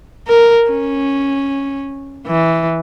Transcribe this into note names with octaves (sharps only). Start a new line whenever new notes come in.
A#4
C#4
E3